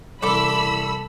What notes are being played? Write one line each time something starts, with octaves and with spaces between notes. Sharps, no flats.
C2 E3 A4 B5 D6 E6